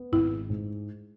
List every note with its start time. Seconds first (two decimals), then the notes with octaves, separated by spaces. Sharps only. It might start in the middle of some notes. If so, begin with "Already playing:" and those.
Already playing: B3
0.12 G#1 E4
0.31 G#3
0.50 G#2